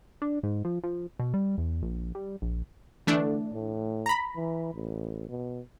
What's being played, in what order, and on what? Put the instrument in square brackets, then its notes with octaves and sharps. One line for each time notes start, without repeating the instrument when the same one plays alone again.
[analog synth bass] D4
G#2
F3
F3
B2
G3
E2
A#1
G3
A#1
[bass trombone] D3 [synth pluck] E3 A3 D4
[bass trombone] A2
[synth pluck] A#5 B5
[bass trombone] E3
A1
B2